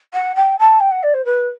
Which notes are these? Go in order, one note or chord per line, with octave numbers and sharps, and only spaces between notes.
F#5
G5
A5
G5
F#5
D5
C5
B4